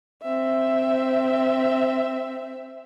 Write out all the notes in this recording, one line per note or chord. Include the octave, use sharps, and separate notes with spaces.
C4 E5